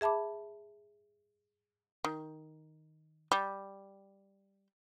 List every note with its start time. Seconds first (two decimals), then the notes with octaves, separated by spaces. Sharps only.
0.01 G#4 E5 A5 B5 D6
2.04 D#3
3.32 G3